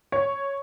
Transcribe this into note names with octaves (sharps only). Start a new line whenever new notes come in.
C#5